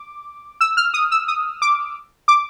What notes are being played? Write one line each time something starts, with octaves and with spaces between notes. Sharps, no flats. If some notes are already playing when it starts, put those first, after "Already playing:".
Already playing: D6
E6
F6
D#6
E6
D#6
D6
D6